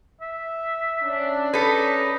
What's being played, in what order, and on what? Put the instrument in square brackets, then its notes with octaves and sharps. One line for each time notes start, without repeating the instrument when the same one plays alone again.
[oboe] E5
[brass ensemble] C#4 D4
[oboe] D#4 [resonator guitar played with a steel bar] A4 B4